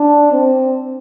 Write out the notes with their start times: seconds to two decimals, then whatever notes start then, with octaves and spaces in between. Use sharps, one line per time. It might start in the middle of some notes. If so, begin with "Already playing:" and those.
Already playing: D4
0.32 C4